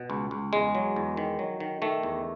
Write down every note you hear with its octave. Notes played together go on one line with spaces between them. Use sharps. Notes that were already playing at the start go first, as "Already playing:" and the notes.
Already playing: B2
C#2
C#2
E2 G#3
F#3
E2
D#3
F#3
D#3
D#3 A3
E2